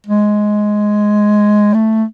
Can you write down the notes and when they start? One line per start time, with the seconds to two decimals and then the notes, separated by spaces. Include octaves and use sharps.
0.07 G#3
1.74 A3